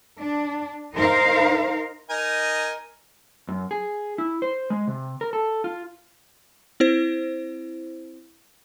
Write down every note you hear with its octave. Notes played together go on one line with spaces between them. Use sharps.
D4
D#4 A#4 C5 F5
D#4 A#4 G#5
F#2
G#4
E4
C5
G#3
C3
A#4
A4
F4
C4 E4 C5